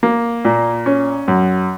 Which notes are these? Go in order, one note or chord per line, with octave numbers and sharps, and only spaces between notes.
A#3
A#2
C#4
F#2